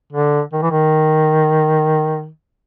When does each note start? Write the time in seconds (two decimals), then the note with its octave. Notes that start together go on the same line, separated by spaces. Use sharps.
0.13 D3
0.53 D#3
0.63 E3
0.71 D#3